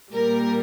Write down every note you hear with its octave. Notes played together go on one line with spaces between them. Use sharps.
A#2 G3 A#3 A#4